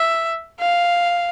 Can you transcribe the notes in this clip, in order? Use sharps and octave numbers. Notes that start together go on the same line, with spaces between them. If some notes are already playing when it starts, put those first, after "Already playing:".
Already playing: E5
F5